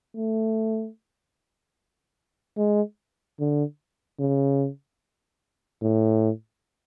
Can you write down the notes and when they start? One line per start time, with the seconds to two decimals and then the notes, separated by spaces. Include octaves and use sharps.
0.15 A3
2.57 G#3
3.40 D3
4.20 C#3
5.82 A2